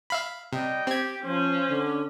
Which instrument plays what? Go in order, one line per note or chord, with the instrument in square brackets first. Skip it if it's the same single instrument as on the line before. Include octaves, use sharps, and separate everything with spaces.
[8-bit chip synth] E5 F5 B5
[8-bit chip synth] C3 [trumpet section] G3 D#5 G5
[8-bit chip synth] C4 G#6 [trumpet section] G4
[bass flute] F3 [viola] C#4 [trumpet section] C5
[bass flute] D3